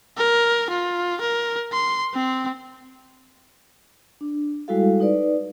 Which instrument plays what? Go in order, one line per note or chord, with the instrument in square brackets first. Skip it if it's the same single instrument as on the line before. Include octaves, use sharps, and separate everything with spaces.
[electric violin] A#4
F4
A#4
C6
C4
[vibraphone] D4
G3 G#3 E4 F#4 A4 F5
D#4 B4 D5